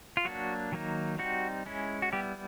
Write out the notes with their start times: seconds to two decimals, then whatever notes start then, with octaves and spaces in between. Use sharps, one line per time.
0.17 F4
0.25 F#3 A#3 D4 F#4
0.72 D#3 F#3 A#3 D#4
1.18 G3 C4 D#4 F#4
1.66 G#3 C#4 E4
2.02 F#4
2.12 G3 B3 E4 G4